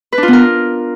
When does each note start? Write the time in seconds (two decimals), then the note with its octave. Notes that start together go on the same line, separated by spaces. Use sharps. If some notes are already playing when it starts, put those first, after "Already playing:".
0.12 B4
0.18 D4
0.23 F4
0.28 B3
0.33 A#4